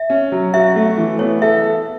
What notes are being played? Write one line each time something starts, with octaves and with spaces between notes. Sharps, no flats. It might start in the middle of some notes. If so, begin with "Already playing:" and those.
Already playing: E5
C#4
F#3
F#4 E5
A3
E3
B3 C#5
A4 E5